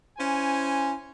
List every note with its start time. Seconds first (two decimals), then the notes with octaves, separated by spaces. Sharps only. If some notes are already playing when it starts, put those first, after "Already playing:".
0.18 C#4 E4 C5 G#5